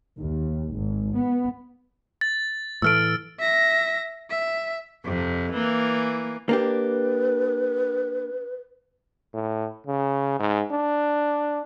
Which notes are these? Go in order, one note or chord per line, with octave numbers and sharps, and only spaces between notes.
D#2
G#1
B3
A6
A2 E3 A3 E6 F6 D7
E5 A#6
E5
F2 C3
E3 A#3
A#3 D4 G4 B4
A2
C#3
G#2
D4